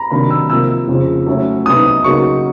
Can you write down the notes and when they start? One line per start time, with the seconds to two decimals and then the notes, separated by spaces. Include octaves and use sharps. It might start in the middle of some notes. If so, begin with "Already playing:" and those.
Already playing: A#5 B5
0.11 C3 D#3 F#3 A#3 D4 B5
0.31 E6
0.49 C3 F3 A#3 E6
0.88 F2 C#3 F3
1.27 F#3 A3 C#4 E4
1.66 C2 B2 F#3 B3 D#4 D#6
2.04 C#3 F#3 A#3 D#4 F#4 C#6